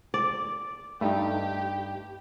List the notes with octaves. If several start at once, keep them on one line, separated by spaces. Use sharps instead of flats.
D5
G2 A3 D#4 G4